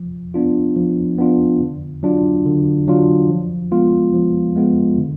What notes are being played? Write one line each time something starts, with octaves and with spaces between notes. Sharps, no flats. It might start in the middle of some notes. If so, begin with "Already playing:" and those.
Already playing: F3
B3 D4 F4
F3
B3 D4 F4
D3
F#3 D4 F4
D3
F#3 D4 F4
F3
G#3 B3 F4
F3
G#3 B3 F4
D3